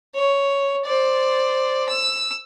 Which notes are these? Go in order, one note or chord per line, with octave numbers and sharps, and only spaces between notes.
C#5
C5 D5
E6